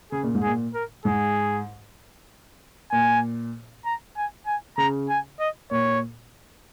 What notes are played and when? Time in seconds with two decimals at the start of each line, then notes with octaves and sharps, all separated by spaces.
0.12 C#3 G#4
0.23 A#2
0.35 G#2
0.43 A#2 G#4
0.75 A#4
1.05 G#2 G#4
2.91 A#2 G#5
3.85 A#5
4.17 G#5
4.47 G#5
4.78 C#3 A#5
5.09 G#5
5.40 D#5
5.71 A#2 C#5